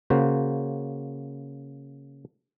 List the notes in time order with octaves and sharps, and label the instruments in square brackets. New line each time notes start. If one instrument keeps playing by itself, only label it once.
[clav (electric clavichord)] C#3 A#3 F#4 C5